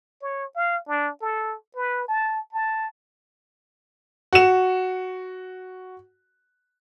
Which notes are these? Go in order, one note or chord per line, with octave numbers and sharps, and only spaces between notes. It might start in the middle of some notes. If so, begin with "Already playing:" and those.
C#5
F5
D4
A4
B4
A5
A5
F#4 E7